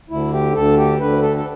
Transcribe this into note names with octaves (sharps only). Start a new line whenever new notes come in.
D2 D3 E4
G4
D2 D3 A4
G4
D2 D3 B4
A4
A4